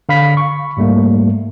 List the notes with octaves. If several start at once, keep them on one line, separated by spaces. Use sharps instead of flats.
D3 F5 B5 B6
C#6
G#2 G3 A3 A#3